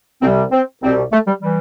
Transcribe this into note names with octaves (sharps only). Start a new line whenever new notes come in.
C2 C3 G3 C4
C4
C2 B2 G3 C4
A3
G3
E3 G3